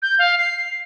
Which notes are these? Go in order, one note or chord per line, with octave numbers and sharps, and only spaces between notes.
G6
F5
C7